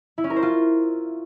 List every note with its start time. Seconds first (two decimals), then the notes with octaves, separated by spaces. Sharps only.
0.18 E4
0.24 C#4
0.30 A#4
0.36 C5
0.43 F4